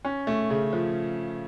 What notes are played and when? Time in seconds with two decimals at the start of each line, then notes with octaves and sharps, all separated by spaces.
0.05 C#4
0.27 A3
0.50 C#3
0.73 F3